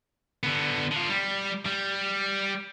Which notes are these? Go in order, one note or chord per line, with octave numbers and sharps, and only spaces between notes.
D3 B3
D3 F4
G3
G3